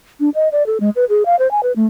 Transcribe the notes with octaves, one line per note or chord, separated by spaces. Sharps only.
D4
D#5
D5
A4
G#3
B4
G#4
F5
C5
G#5
B4
A3